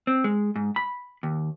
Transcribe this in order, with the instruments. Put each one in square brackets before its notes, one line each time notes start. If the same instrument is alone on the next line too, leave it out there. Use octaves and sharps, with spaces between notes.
[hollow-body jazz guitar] C4
G#3
G#2
B5
D#2